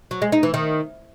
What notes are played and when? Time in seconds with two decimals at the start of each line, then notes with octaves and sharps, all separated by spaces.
0.11 F#3
0.22 G#3
0.32 D#4
0.43 E3
0.54 D#3